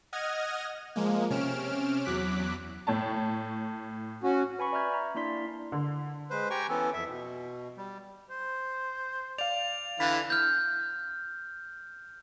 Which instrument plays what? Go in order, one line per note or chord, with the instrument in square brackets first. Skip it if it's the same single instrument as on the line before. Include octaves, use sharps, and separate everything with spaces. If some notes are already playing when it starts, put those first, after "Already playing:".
[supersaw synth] D#5 F#5 D#6 F6 G#6 A#6
F3 G#3 A#3
C3 C#4 F6 D7 E7
E2 F#3 D6 F#6 B6
[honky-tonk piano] A2 C#5 A5
[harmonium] C#4 F#4
[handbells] B4 G#5 B5 C#6
D5 E5 A#5 F6 G6 G#6
A#5
A#3 D4 E4 D5 C6 B6
[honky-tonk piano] D3
[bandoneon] G#3 B4 C5
G4 G5 G#5 A#5 C#6
E3 B3 C#4 A4
F2 E5
B2
G3
[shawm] C5
[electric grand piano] D5 F5 [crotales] F7
[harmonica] D3 E3 [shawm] F5 [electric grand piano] B5 A6 B6
[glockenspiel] F6 G6